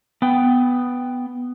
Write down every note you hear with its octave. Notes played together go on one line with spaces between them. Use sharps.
B3 G5